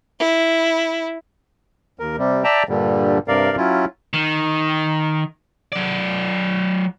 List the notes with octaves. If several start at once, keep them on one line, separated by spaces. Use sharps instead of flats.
E4
D#2 A#4
C3 G3
D5 E5 G5 A5 A#5
G2 A#2 D3 G3
G2 C3 A#4 D5 F5
F#3 C#4 E4 F4
D#3
F#3 D5